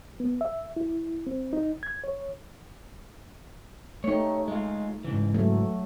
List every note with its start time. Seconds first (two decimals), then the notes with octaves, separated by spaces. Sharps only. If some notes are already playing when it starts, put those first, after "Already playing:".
0.20 B3
0.41 E5
0.76 E4
1.27 C4
1.53 D#4
1.83 G#6
2.04 C#5
4.04 A3 D#4 G4 C#5
4.48 G#3 F4
5.05 G#2 C#3 E3
5.34 F#3 A3